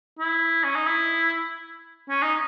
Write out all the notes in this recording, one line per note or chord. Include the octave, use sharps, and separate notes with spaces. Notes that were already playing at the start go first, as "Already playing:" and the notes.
E4
C#4
D#4
E4
C#4
D#4